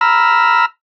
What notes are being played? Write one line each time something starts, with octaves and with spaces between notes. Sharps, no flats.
A#5 B5 E6 F6